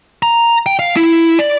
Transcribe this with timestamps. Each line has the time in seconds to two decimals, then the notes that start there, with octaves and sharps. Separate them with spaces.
0.23 A#5
0.66 G5
0.79 F5
0.96 E4
1.39 D5